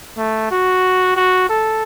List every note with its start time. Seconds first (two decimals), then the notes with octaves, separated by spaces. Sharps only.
0.17 A3
0.51 F#4
1.16 F#4
1.49 A4